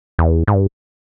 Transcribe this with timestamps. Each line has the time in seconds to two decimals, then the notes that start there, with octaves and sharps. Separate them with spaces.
0.19 E2
0.47 G#2
0.54 G2